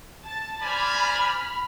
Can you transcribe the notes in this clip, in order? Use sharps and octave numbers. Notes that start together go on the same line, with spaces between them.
A5 A6
C5 D5 G#5 B5 F6